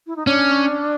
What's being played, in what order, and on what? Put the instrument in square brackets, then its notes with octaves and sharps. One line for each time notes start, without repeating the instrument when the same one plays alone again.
[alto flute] E4
D#4
[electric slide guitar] C#4 [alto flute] D4